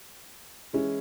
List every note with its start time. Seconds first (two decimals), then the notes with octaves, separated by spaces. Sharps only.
0.73 E3 G#3 C#4 E4